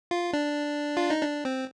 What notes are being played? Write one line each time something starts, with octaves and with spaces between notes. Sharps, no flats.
F4
D4
F4
D#4
D4
C4